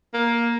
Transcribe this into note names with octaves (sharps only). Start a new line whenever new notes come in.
A#3